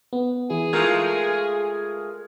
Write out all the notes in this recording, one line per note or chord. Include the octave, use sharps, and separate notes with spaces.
B3
E3 E4 G#4
G#3 A3 F4 A#4 F6 G#6